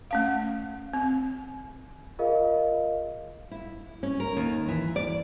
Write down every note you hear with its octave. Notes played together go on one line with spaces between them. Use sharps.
A3 C#4 F5
C4
F4 G#4 A#4 D#5 F5
E4
C#4
A#4
D#2
E3
D5